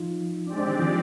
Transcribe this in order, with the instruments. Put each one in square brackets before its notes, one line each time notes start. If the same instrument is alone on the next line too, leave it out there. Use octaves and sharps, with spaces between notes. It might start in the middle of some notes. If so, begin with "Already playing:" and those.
Already playing: [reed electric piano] F3 D#4 F4
[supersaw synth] G#3 C4 G4 D5 [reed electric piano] D4
[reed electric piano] D4
D#3 D#4
F3 F4